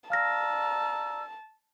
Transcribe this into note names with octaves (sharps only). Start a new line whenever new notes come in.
D5 F5 A5 A#5 E6 F6 A#6